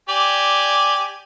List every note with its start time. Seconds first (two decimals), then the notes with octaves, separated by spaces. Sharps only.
0.09 G4 D5 G#5